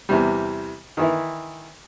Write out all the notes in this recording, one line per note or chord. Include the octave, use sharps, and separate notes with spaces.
E2 C3 G3
D#3 E3 E4